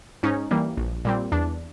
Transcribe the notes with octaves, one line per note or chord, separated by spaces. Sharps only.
G#2 C#4 D#4
E3 G3 A#3
A#1
A#2 G3 C4
E2 D4